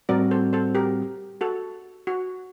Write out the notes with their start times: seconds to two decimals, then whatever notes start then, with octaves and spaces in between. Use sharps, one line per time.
0.09 A2 G3 C4 F#4 A#4 D5
0.31 A4 C5
0.53 A4 C5
0.75 G4 A#4
1.41 F#4 A4
2.07 F#4